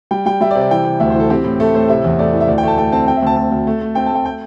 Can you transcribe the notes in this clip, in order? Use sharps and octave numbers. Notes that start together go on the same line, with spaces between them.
G3 G5
G3 G5
G3 E5
D5
C3
D5
E3 G5
C3
D2 E5
C5
E3
A4
C4 G4
A2
A3 A4
A2 C5
C3 E5
E2
A3 D5
E3
E5
D2 D5
G5
A3 A5
A3 G5
C4 A5
C4 G5
E5
D2 A5
D2 A5
D2
A3
A3
C4 G5
A5
A3 G5
G5